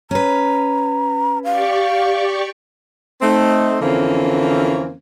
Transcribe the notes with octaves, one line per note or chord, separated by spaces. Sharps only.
C#4 B4 A#5
G4 D5 F5 C#6
A3 C4 D#4
F2 D3 E3 A#3 C4 C#4